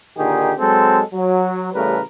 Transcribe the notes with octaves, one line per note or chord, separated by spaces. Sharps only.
A#2 D3 D#3 D#4 G4 G#4
F#3 G#3 C4 A4
F#3
A1 C#3 G3 A3 A#4 B4